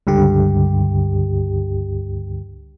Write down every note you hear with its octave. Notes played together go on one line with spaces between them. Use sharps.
C#2 G2 D3 G4